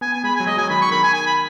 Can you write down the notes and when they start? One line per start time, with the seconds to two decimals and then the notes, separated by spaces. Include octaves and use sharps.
0.01 B3 G#5
0.13 G#5
0.24 G#3 B5
0.36 F#3 G#5
0.47 G#3 D#5
0.58 F#3 G#5
0.70 D#3 B5
0.81 C#6
0.92 D#3 B5
1.03 G#5
1.14 G#5
1.26 B5